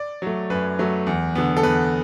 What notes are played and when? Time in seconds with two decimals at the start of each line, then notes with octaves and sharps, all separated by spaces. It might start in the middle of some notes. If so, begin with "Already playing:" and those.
Already playing: D5
0.22 F#3 A3
0.50 F#2 B4
0.79 F#3 A3
1.07 E2
1.35 D3 B3
1.57 A4
1.63 E2 B4